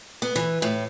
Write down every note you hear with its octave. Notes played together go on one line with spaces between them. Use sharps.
B3
E3
A2